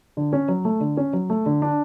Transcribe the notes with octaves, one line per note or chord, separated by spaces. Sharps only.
D3
C#4
F#3
A3
D3
C#4
F#3
A3
D3
D4